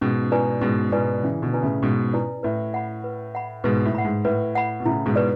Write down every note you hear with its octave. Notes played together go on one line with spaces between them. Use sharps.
G#2 B2 C#4
E4 B4 D5 G#5
G#2 B2 C#4
G#2 B2 E4 B4 D5 G#5
C#3 E3 C#4
B2 D3
E4 B4 D5 G#5
A2 C#3
G#2 B2 C#4
E4 B4 D5 G#5
A2 B4
F#5 B5
B4
F#5 B5
G#2 B2 B4
A2
F#5 B5
G#2
A2 B4
F#5 B5
B2
A2 C#3 E4
G#2 B2
B4 D5